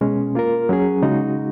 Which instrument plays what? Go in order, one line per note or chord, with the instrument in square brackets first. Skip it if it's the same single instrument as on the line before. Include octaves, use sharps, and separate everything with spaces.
[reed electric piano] B2 G#3 C#4
A#3 F4 A#4
F#3 C#4 G#4
C#3 G#3 D#4 F#4